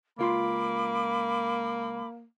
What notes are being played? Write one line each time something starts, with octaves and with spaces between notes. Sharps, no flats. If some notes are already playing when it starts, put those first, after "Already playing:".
C#2 A#3 F4 B5 C6 D6